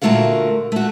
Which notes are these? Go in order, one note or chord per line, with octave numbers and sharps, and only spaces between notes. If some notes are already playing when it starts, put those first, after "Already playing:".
A#2 D3 A3 F#4 A#4 F5
A3 F#4